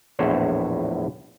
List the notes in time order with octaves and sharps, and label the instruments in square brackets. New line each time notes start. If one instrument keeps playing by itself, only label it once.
[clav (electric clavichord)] A#1 E2 A2 C5 C#5